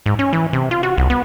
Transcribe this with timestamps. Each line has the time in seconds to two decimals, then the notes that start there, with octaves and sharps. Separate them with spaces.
0.06 G#2
0.19 C#4
0.33 E3
0.53 C3
0.71 F4
0.83 F#4
0.98 C2
1.10 B3